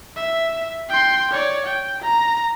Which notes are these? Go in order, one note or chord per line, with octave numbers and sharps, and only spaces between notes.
E5
G5 C6
C#5 D5
G5
A#5